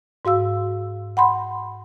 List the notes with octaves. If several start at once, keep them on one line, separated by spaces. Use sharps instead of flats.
G#2 F#4 F5 E6
F#5 B5 C6